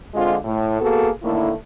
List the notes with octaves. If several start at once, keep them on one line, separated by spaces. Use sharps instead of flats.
D3 G#3 C4 F4
A2
A#3 B3 F#4 G#4 A4
A2 D3 D#3 A3 A#3 E4